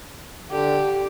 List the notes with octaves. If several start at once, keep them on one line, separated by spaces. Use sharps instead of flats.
D3 G4